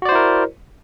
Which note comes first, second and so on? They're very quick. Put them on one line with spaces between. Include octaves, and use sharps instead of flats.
F#4 D5 C5 E4 A#4